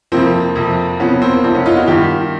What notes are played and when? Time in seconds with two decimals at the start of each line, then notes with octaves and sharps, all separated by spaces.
0.12 F2 C3 F3 A#3 C4
0.56 F2 C3 F3
1.00 F2 C3 F3 B3 C#4
1.22 A#3 C4
1.44 F2 C3 F3 C4 D4
1.55 B3 C#4
1.66 D#4 F4
1.76 E4 F#4
1.87 G2 D#3 F4 G4